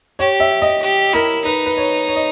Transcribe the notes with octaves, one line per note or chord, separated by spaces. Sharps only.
G4 C#5
E5
D#5
G4
E4 A#4
D#4 B4
B4
C#5
C#5
D#5